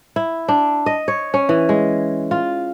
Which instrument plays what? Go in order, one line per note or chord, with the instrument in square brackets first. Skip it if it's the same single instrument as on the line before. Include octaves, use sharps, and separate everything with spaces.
[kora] E4
D4
D#5
C#5
C#4
E3
G#3
F4